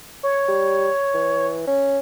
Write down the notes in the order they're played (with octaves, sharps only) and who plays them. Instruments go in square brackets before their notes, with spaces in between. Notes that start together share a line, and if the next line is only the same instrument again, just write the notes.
[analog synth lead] C#5
[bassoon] G3
E3
C#4